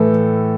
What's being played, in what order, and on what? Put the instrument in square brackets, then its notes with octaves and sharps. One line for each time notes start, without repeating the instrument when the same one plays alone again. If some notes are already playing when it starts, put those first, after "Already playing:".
Already playing: [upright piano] A2 E3 A4